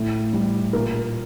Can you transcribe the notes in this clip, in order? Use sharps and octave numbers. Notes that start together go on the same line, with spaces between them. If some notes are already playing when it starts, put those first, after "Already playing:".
Already playing: A2
G3
A#2 A#4